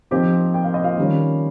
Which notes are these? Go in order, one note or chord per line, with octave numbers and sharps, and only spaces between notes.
F3 C4 D#4 G4 G5
G5
F5
D#5
F4 F5
D#3 G3 C#4